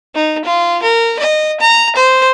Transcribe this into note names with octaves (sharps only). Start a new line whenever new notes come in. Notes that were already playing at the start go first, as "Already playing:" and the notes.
D#4
F4
A#4
D#5
A#5
C5